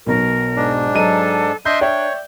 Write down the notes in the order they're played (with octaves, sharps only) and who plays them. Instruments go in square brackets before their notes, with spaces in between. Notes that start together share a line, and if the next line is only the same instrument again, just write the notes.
[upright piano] B1 B2 [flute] A#4
[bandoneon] G#2 D4
[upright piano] F#3 D#5 D#7 [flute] A4
[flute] D4 [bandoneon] D#5 E5 C6 [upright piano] G6
[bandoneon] C#5 [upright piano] D5 E5 G5